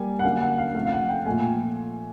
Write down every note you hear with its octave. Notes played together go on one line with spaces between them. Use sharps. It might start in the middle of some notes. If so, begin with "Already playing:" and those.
Already playing: G3 A#3 G#5
F#5
D3 F#3 A#3 C#4 F5
F#5
F5
C3 F3 A3 F5
F5
F#5
G5
A#2 F3 A3 G#5